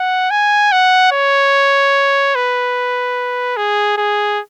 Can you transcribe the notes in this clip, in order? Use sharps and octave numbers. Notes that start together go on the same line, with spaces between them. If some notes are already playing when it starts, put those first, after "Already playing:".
Already playing: F#5
G#5
F#5
C#5
B4
G#4
G#4